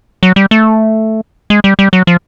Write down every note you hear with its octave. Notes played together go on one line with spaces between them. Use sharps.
F#3
G3
A3
G#3
G3
G3
F#3
F3